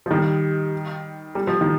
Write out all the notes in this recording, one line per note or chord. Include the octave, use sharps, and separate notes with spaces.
F3
D#3 G3
G3
F3
D#3